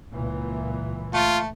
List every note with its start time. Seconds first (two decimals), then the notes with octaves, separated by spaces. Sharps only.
0.13 C#2 A#2 E3
1.14 A3 F4